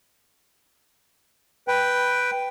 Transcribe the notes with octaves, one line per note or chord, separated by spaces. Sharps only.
B4 G5